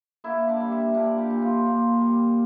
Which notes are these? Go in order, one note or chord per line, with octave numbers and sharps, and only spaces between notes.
A#3 E4 E5
D4 D5
G3
E4 E5
A#2 D4 D5
G3 G4
A#2
F3 F4
A#3
G3